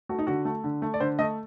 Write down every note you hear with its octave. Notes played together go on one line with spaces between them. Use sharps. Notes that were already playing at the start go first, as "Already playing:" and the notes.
A3 F#4
D#4
D3 F#4
A3
D3
A3
D5
D3 C5
A3 D#5